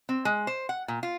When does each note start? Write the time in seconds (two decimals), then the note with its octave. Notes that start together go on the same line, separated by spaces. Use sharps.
0.09 C4
0.25 G#3
0.47 C5
0.69 F#5
0.88 A#2
1.03 F4